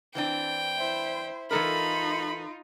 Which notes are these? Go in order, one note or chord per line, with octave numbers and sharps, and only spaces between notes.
E3 C4 D4 G5
E4 C5
E3 D#4 F4 A4 A#4 B5